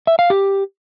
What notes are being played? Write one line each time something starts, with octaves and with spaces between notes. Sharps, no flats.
E5
F5
G4